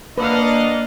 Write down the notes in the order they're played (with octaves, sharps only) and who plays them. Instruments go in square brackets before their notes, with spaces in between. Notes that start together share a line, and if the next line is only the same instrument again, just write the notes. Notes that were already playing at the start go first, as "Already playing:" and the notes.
[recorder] A#3 [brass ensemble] D4 D#5 [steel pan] B4 [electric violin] F5 F#5